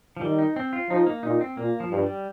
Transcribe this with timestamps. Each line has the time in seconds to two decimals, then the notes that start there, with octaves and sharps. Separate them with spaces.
0.17 F3
0.21 D#3 G3
0.39 D#4
0.56 C4
0.73 F4
0.90 F3 D#4
1.07 A#3
1.23 A#2 D#4
1.41 C4
1.57 A#2 A#3
1.80 F3
1.91 G2 F3
2.03 G3